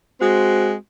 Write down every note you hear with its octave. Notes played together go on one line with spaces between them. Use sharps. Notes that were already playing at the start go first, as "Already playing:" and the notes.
G#3 C4 F#4